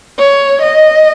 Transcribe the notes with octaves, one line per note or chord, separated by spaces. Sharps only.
C#5
D#5